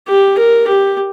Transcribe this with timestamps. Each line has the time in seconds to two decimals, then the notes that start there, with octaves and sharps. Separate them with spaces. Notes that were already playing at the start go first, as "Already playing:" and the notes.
0.09 G4
0.38 A#4
0.68 G4